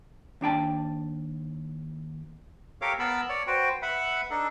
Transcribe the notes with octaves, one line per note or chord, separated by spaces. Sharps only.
D#2 D4 G5 A5
G4 A4 A#4 C#5 F5 D6
B3 A#4 A5 B5 E6
C#5 D5
F#4 B4 C5 G5
B4 E5 F#5 B5
D4 D#4 A4